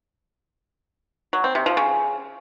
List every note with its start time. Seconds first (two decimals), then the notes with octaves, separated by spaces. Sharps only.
1.33 F#3
1.44 C4
1.55 C3
1.66 F3
1.77 C#3